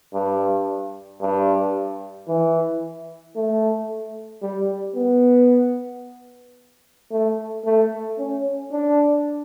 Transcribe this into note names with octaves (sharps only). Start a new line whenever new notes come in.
G2
G2
E3
A3
G3
B3
A3
A3
C#4
D4